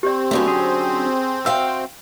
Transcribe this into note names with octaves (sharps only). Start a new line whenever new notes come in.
C4 G4 D5
D3 F#3 A3 B3 C#4
G#4
F#4 E5 F5 G5